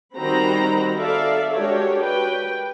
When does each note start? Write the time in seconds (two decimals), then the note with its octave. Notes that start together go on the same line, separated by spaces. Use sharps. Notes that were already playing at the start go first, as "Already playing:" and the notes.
0.16 D#3 G3 C4 F#4 A#5 B5
0.98 A4 D5 E5 F5
1.54 G#3 D4 F#4 G4 A#4 C#5
2.01 B4 G5